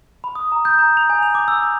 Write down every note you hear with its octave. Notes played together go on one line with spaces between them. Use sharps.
B5
D#6
A#5
G6
A#5
F7
G#5
F7
D6
E6
E6